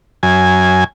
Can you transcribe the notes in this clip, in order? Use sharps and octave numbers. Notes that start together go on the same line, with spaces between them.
F#2 G#5